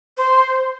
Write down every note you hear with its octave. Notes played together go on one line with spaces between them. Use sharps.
C5